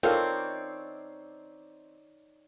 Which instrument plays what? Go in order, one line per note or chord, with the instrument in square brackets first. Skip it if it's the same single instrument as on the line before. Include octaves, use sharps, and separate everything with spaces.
[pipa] C4 [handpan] D#4 C#5 D5 [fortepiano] F4 A4 F5 [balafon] A#4